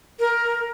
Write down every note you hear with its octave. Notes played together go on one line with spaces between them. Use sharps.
A#4